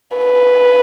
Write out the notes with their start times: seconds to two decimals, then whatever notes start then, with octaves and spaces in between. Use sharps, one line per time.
0.17 B4